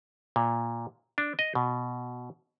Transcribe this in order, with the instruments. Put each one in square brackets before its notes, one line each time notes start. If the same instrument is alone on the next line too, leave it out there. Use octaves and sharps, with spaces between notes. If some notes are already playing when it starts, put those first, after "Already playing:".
[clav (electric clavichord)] A#2
D4
D#5
B2